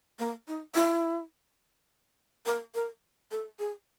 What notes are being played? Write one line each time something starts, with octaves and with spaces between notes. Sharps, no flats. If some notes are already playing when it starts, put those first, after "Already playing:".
A#3
D#4
E4
A#4
A#4
A4
G#4